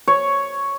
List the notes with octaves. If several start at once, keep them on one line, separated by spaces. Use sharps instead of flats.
C#5